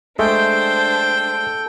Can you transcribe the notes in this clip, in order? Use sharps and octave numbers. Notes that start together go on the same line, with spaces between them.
G#3 A3 D4 A4 C5 G5